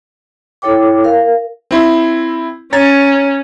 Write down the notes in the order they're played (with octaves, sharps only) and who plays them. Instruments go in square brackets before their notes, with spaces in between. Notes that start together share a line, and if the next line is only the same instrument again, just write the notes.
[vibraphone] E4 A4 C#5 G5 D6
A#4 F5
[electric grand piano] C4 E4 C6
[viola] C#4 [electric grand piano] C#5 A#5 A6